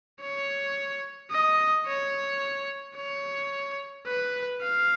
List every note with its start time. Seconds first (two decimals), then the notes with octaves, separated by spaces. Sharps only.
0.21 C#5
1.31 D#5
1.86 C#5
2.96 C#5
4.06 B4
4.62 F5